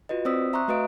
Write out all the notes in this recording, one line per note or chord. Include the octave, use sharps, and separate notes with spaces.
F4 F#4 B4 D#5
C4 C5 D5 D#6 E6 B6
E5 A#5 C6 C#6 D#6 F#6
A3 F#4 B4 D#5 F5 D7